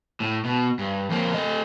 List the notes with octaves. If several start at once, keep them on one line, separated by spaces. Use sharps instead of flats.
A2
B2
G2
F2 A#3
A3 D#5